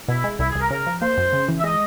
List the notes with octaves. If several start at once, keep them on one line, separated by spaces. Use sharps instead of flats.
B2 E4
G#3
C2 E4
G#4
C2 A#4
C#3 A#4
F3
A#3 C5
F#2
C#3
E3
E5
G#3 D#5